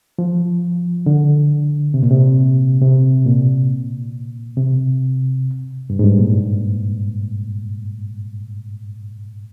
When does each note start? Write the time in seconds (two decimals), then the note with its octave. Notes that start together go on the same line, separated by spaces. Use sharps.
0.19 F3
1.06 D3
1.94 C3
2.03 A#2
2.11 C3
2.82 C3
3.26 A#2
4.57 C3
5.90 G2
5.99 G#2
6.04 G2
6.19 A#2